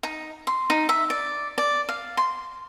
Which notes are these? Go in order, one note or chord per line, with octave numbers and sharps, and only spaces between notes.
D#4
C6
D#4
E5
D5
D5
F5
C6